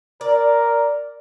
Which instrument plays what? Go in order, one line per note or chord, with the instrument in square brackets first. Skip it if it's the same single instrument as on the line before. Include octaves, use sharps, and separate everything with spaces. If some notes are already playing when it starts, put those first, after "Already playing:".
[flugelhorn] A#4 [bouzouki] D5